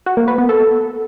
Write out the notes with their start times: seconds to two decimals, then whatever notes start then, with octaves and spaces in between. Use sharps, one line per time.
0.06 F#4
0.17 A#3
0.28 B4
0.38 B3
0.49 A4